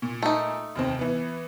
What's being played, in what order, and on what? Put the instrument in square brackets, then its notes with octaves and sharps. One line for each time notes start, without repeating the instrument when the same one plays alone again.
[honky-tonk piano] A#2
[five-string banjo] A3 D#4
[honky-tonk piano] F1 D#2 C4
E3 B3